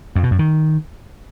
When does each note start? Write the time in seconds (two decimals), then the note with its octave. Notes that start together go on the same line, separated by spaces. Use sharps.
0.16 F2
0.23 B2
0.31 F#2
0.39 D#3